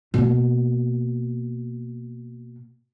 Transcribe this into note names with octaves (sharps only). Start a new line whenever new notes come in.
B2 A#3